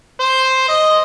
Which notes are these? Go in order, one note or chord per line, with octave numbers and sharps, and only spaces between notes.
C5
D#5